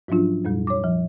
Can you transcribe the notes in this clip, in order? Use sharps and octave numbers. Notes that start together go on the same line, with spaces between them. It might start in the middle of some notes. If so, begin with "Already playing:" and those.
G#2 F3 F#3 C#4 D4 F4
F2 A#2 G3
C#5 D6
F3